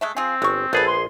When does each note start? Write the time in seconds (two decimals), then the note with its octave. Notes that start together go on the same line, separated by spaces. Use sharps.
0.01 G#3 A3 E5
0.17 C4 F4 G#4
0.42 G1 G#3 C#6
0.73 A#1 B3 G#4 A4 B4
0.87 C6